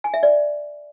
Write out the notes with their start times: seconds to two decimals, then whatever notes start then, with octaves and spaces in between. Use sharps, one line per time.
0.04 G#5
0.14 E5
0.23 D5